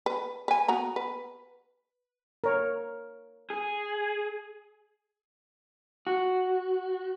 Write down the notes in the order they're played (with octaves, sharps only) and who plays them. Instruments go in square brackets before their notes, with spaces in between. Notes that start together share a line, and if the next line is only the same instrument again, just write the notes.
[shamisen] B4
B4 G#5
B3 F#4 A#5
B4
[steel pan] A#4 C#5
[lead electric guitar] G#4
[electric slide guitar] F#4